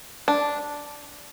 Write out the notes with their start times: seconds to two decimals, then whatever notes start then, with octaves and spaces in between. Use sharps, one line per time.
0.28 D4